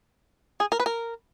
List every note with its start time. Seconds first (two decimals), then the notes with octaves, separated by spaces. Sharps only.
0.60 G#4
0.72 A#4
0.80 B4
0.86 A#4